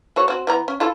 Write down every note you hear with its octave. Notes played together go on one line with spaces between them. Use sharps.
A3 F#4 C#5
C4 F#4
E3 B3 A#5
C#4
E4 F4 A4